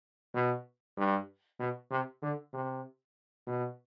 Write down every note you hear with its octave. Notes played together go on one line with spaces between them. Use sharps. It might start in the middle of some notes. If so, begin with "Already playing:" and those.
B2
G2
B2
C3
D3
C3
B2